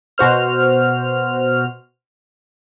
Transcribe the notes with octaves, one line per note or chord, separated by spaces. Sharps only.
B2 F#4 C5 F6